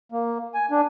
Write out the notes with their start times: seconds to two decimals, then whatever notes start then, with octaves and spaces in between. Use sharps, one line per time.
0.12 A#3
0.55 G#5
0.71 D4